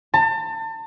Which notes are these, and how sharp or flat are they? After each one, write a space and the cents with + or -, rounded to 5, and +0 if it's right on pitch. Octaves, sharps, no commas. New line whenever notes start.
A5 +35